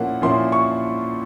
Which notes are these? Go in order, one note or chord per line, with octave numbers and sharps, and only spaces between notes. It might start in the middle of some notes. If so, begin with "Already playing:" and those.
Already playing: A#2 F3 A#3 C#4 E4 F#5
A#2 F3 A#3 C#4 E4 C6
C#6